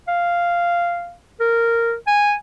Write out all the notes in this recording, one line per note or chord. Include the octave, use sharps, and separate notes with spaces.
F5
A#4
G#5